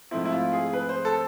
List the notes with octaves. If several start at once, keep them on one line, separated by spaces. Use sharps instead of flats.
G#2 F3 A3 C4 E4
E4
F4
G#4
B4
C5
A4